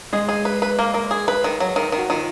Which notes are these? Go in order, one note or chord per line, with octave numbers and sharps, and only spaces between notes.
G#3 G#4
G#4
B4
B4
A#3
A#3
G#4
B4
D#3
F#3
D#3
D#3
F#4
D#3 F4